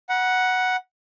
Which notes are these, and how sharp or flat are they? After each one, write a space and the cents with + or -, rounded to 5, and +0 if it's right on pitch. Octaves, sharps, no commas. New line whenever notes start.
F#5 +0 B5 -45